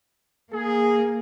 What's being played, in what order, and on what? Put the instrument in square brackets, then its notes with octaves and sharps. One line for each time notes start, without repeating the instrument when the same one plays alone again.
[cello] A#3 [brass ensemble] G#4